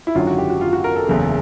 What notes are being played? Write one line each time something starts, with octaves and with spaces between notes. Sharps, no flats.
E4
G#1 F#2 D3 F#3 F4
F#4
G4
F#4
F4
F#4
A#4
A4
F#1 E2 C#3